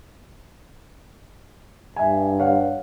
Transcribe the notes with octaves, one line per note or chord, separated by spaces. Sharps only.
G2 E5 G#5
C#5 F5 F#5